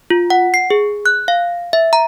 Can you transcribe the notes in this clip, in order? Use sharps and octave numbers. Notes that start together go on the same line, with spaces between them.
F4
F#5
C7
G#4
F#6
F5
E5
A#5